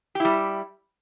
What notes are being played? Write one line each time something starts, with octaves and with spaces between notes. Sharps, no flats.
G3 E4 G4